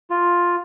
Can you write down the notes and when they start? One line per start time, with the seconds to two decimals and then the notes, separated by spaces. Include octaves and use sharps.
0.10 F4